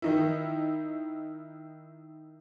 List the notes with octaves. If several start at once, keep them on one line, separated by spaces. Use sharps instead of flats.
D#3 D#4 E4